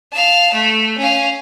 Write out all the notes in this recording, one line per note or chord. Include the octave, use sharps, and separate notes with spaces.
F5 A5
A3
C#4 F5